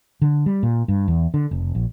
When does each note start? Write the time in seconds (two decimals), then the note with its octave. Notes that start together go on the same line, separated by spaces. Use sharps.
0.22 D3
0.46 G3
0.63 A#2
0.88 G2
1.08 E2
1.34 D3
1.51 F1
1.75 A#1